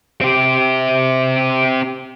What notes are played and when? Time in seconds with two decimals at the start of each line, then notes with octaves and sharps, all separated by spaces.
0.21 C4 G4